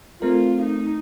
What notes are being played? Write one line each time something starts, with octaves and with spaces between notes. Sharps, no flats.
A3 C4 F4 A#4
D#4